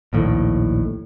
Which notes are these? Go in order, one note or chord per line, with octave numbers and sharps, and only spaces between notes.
A#1 D#2 A2